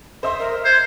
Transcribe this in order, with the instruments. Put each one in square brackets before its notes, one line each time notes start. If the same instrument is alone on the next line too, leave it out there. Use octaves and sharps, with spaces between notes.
[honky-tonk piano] C5 D#5 E5 [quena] C6
[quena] A#4
[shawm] C5 [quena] G#6